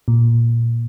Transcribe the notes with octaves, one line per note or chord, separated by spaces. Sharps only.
A#2